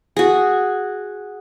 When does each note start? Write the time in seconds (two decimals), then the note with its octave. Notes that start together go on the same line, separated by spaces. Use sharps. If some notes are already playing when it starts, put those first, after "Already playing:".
0.16 F#4 G#4